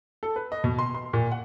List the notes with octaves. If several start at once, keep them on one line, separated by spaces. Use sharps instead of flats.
A4
B4
D#5
B2
C6
C6
A#2
F#5